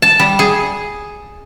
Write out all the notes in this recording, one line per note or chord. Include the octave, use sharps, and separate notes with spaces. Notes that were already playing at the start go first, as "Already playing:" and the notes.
A5
G3
G#4